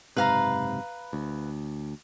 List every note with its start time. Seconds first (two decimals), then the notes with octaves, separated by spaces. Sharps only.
0.17 F#1 G#2 C3 B4 F5 A#5
1.13 D2